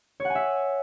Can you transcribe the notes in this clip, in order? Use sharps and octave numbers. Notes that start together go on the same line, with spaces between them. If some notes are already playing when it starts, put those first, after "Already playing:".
C#5
F#5
G#5
E5